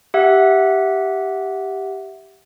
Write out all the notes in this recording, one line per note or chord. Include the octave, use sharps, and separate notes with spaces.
G4 E5 F#5